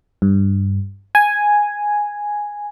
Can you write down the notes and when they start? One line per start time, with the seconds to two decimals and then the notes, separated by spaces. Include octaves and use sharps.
0.22 G2
1.15 G#5